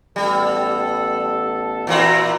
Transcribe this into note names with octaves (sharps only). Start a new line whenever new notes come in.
A1 G3 B3 A4
A#2 E3 C4 F#4 C5 A#5